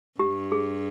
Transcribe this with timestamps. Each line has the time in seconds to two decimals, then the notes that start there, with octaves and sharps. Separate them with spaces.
0.19 G2 G4
0.52 G#4